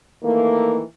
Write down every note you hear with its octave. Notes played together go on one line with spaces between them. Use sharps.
D#3 E3 A3 A#3